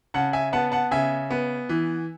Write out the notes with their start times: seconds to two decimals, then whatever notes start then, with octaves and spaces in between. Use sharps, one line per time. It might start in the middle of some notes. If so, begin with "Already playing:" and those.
0.14 C#3 F#5 A5
0.33 E5 G#5
0.53 B3 F#5 A5
0.72 F#5 A5
0.91 C#3 E5 G#5
1.30 B3
1.69 E3